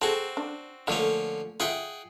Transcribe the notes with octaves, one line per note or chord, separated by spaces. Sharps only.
C4 F#4 G#4 A4
D4
D3 F3 A3 A#3 C#4
F4 G#4 E5 F#5 G5